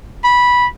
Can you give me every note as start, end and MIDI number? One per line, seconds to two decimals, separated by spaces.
0.24 0.66 83